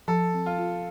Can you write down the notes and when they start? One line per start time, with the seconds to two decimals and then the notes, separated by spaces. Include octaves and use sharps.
0.08 F3 A4
0.34 C4
0.46 F4
0.58 F4